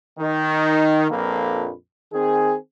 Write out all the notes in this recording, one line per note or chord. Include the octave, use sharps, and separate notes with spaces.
D#3
A#1 F2 A#3 A4 B4
D#3 C4 G#4